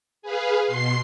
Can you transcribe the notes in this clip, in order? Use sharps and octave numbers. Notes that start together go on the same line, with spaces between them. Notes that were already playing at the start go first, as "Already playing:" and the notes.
G#4 B4 F5
B2 C6 C7